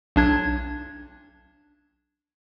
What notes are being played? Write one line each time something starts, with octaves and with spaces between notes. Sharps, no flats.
B1 D4 G#6